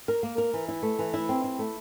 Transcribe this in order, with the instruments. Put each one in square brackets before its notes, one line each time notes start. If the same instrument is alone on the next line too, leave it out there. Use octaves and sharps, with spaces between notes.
[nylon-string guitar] A#4
A#3
A#4
E3
E4
A3
E3
E4
C4
E4
A3